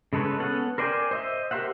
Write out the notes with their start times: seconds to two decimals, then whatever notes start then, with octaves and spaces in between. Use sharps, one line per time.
0.13 C#3 G#3 A4 B4 C#5
0.40 B3 C#4 A4 F#5
0.78 A#4 C5 D5 G5 G#5
1.11 C5 D#5 E5
1.51 G4 A#4 C5 E5 F#5